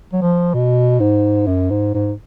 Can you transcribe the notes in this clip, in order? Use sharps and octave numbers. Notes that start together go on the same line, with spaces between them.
F#3
F3
B2
G#2
F#2
G#2
G#2